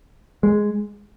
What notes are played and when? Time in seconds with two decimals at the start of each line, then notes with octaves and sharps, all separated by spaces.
0.43 G#3